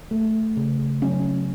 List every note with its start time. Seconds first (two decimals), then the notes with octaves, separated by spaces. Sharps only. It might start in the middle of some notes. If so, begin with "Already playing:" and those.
Already playing: E3
0.11 A3
0.57 C#3
1.02 F#3 C#4